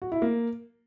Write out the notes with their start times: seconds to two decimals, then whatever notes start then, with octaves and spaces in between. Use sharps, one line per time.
0.02 F#4
0.12 E4
0.22 A#3